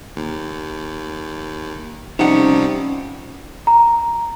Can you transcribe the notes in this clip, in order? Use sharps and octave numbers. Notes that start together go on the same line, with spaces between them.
D#2
C3 F3 G3 C#4 D#4 F#5 C#6
A#5